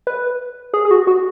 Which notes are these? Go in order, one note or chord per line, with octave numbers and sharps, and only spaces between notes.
B4
G#4
G#4
F#4
F#4